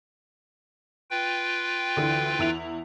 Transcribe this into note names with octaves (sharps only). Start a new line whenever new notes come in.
F4 B4 G5
D2 D3 E3
E2 E4 F7